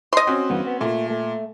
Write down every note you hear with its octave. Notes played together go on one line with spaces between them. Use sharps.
D#5 C6
C4 C#4 F#4
E2 G2 B3
B3
A#2 A3
A3